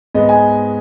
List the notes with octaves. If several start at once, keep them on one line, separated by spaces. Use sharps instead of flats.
G#2 G#3 B3 D#5
G#5